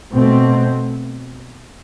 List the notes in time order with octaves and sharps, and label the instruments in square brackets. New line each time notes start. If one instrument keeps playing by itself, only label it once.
[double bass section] B2 A3 C4